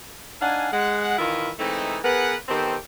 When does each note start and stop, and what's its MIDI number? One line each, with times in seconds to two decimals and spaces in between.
0.41 0.71 62
0.41 0.71 63
0.41 0.71 77
0.41 0.71 78
0.41 0.71 80
0.72 1.17 56
0.72 1.17 78
1.18 1.51 51
1.18 1.51 52
1.18 1.51 64
1.18 1.51 65
1.59 1.99 52
1.59 1.99 56
1.59 1.99 57
1.59 1.99 60
1.59 1.99 63
2.04 2.36 59
2.04 2.36 68
2.04 2.36 70
2.04 2.36 71
2.04 2.36 78
2.48 2.76 51
2.48 2.76 59
2.48 2.76 60
2.48 2.76 67
2.48 2.76 69
2.48 2.76 72